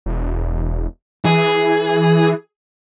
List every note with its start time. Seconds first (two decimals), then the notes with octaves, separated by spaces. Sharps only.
0.06 E1
1.25 E3 G#4